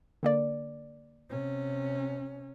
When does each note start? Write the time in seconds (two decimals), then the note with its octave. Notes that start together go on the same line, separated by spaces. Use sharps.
0.23 D3 A#3 D5
1.30 C3 C#4